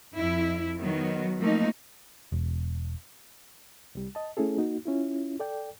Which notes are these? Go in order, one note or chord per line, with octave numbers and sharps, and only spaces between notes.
F2 E4
D#3 F#3 B3
F3 A3 A#3 C4 D#4
E1
C2 G3
D#5 A5
A3 C#4 E4 G#4 A4
A#3 D#4 F#4
C#4 E4 F4
A4 D5 G5